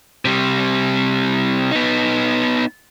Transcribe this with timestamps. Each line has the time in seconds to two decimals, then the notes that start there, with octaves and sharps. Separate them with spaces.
0.25 C3 G3
1.71 B3 D#4